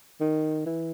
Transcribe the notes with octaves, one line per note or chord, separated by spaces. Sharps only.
D#3
E3